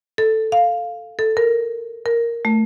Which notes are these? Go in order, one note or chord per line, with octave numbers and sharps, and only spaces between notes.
A4
F5
A4
A#4
A#4
A3